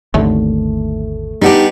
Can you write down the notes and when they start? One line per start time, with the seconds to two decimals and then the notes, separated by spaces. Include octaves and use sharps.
0.14 G#1 D#2 D3 A3
1.42 G3 B3 D4 D#4 G4